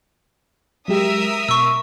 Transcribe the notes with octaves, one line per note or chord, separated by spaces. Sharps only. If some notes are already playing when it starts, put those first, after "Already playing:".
F#3 G#3 G4 A#4 E5 D#6
B2 C#6 E6